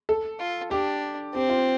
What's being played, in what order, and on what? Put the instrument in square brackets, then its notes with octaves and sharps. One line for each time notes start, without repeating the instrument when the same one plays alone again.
[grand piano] A4
[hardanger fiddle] F4
[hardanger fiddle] D4 [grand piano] G4
[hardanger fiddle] C4 [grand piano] G4
[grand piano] F4